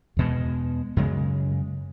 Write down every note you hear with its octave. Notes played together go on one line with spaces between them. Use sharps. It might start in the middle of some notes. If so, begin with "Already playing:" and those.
E2 B2 G#3
F#2 C#3 G#3